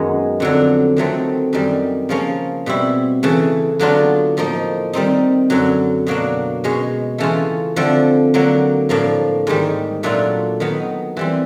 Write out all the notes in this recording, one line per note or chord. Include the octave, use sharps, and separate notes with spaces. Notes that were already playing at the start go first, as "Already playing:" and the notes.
Already playing: F#2 D#3 G#3 B3
F2 D3 F#3
D#3 F#3 A3 C4
F#2 D#3 G3
C#3 F3 A#3 C#4
B2 G3 C4 E4
C#3 E3 A3
D3 F#3 B3 D4 F4
A2 F3 A#3 D#4
D#3 G3 C4 D#4
F#2 D3 F#3
B2 F#3 A#3 D4
B2 G#3 C#4
C#3 E3 A3 C#4 F4
D3 F3 A3 C4
D3 F#3 A#3
A2 F3 A#3 D4
G#2 D#3 G3
A#2 F#3 A3 D4 F4
D#3 F#3 B3
E3 G3 C4